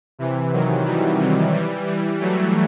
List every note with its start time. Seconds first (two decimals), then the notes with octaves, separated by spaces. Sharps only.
0.19 C3 E3
0.52 D#3 F#3
0.85 E3 G3
1.19 C3 E3
1.54 E3 G3
1.86 E3 G3
2.20 F#3 A3